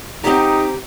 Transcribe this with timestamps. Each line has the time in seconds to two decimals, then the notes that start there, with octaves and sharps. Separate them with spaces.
0.24 C4 D#4 G4 A#5